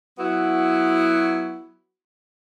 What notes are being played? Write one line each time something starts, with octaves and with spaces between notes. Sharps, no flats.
F#3 B3 E4 F#4